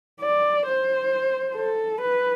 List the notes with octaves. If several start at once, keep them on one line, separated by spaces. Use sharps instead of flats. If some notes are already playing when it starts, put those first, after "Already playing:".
D5
C5
A4
B4